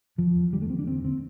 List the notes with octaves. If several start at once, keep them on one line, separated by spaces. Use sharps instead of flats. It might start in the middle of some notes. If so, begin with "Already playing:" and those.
E2 F3
E2
D3 G3
A3
E2 C4
D4
D3 C4
D3 C4